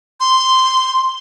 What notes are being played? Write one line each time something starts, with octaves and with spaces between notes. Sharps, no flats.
C6